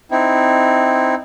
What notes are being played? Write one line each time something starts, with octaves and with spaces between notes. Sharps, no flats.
C4 D#4 E4